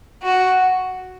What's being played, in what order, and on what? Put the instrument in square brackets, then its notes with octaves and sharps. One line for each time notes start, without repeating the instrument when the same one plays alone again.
[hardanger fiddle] F#4